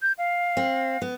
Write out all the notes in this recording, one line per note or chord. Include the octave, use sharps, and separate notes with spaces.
G6
F5
C4
B3